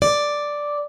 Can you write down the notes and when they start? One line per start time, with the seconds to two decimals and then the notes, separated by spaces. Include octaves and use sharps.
0.02 D5